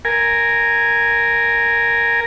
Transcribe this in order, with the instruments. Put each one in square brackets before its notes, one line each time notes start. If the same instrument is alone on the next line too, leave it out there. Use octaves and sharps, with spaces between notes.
[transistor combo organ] A#4 G#5